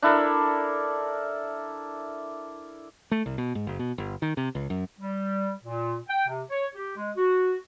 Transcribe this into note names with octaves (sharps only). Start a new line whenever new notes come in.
D4 E4 A4 A#4
A3
C2
B2
G#2
F#1
B2
G1
D#3
C3
C#2
F#2
G3
A#2
G5
C3
C#5
G4
G#3
F#4